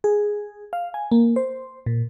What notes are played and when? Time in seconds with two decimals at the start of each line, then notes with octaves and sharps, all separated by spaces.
0.04 G#4
0.73 F5
0.94 G#5
1.12 A#3
1.36 C5
1.86 A#2